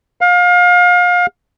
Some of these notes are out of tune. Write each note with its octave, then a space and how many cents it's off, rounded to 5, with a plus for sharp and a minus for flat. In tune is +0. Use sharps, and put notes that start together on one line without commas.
F5 +30